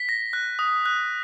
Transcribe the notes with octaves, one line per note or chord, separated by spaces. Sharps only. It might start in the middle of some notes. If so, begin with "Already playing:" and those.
Already playing: B6
A#6
F#6
D#6
F#6